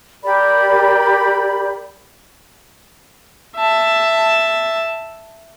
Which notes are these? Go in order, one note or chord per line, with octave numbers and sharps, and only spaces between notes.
G4 A#4 D5 B5
E5 A5